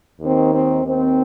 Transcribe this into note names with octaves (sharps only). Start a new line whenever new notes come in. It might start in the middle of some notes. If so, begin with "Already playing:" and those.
D#2 D#3 C4
C4
D#2 D#3 C4